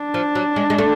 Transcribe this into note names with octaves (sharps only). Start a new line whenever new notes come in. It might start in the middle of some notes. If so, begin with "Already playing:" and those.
Already playing: D4
F3
F#3
G#3
G#3
A3